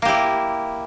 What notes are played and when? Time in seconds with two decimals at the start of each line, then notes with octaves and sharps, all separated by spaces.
0.02 A#3
0.05 G4
0.09 E4